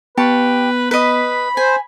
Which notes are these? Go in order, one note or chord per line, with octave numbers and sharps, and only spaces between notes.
B3 G4 B4 A5 C#6
B4 D#5 B5
C5 G#5